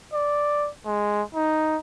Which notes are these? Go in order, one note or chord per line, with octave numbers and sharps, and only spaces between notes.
D5
G#3
D#4